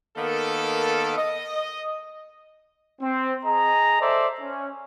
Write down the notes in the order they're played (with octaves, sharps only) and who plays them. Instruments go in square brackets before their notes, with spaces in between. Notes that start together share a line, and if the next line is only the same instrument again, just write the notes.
[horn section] D#3 A#3 B3 A4
D#5
[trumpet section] C4
G#4 D#5 A#5
A4 C5 D5 E5
C#4